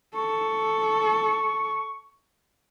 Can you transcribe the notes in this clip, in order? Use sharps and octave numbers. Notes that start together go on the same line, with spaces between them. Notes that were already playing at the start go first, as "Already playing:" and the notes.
A4 C#6